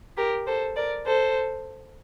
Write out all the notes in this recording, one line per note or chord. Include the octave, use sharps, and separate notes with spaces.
G4 A#4
A4 C5
A#4 D5
A4 C5